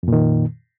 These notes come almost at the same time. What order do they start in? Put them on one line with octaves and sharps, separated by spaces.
F2 A#2 D#3